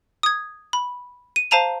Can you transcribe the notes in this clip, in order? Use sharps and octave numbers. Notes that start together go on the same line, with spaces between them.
D#6 G#6
B5
D#7
C5 F5 A5 A#5 D#7 F7